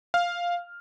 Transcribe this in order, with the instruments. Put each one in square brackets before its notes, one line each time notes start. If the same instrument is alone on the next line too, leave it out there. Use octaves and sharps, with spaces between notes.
[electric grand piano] F5 F6